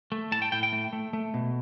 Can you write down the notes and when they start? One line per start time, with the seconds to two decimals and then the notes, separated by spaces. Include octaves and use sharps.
0.12 A3
0.32 A2 A5
0.42 G5
0.52 A2 G5
0.63 G5
0.73 A3
0.93 A3
1.13 A3
1.34 B2